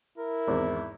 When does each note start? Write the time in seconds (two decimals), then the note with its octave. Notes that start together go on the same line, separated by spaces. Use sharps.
0.18 E4 A#4
0.47 G#1 E2